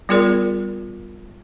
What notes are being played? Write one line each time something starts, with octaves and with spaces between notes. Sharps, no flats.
G3 B3 F4 G#4 A#4 D5